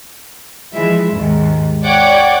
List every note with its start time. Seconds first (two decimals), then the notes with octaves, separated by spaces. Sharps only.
0.74 E3 F3 G#3 E5
1.10 D#2 G#2
1.85 C#5 D5 F#5 G5 D6 G#6